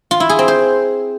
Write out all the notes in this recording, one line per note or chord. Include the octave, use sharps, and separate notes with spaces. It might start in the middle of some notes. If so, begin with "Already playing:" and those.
F4
E4
G#4
C4
C5